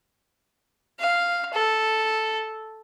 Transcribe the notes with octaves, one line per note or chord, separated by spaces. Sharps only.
F5
A4